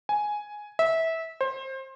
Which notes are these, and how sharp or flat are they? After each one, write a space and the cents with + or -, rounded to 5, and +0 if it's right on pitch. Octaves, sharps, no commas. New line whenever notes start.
G#5 +5
E5 -20
C5 +25